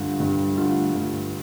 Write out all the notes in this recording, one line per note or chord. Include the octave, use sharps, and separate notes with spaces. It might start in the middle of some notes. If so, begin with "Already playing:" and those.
Already playing: G2 D3 A3 F4
G2
D3 A3 F4
G2